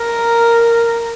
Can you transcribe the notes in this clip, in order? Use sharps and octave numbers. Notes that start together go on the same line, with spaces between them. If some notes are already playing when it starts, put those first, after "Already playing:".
Already playing: A#4